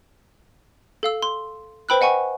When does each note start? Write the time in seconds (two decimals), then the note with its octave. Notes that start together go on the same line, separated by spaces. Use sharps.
1.03 A4 F5 E6
1.23 C6
1.89 B4 C5 G5 B5 E6 F#6
2.01 D#5 F#5 G#5 C#6